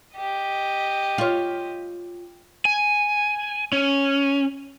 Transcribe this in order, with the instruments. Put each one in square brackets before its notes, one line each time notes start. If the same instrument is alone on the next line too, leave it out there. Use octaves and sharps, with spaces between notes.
[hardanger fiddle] G4 D#5
[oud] F4 C#5
[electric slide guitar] G#5
C#4